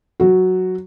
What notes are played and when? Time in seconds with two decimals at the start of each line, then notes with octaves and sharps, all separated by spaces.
0.20 F#3 F#4